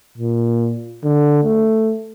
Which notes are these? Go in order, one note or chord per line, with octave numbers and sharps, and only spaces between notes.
A#2
D3
A3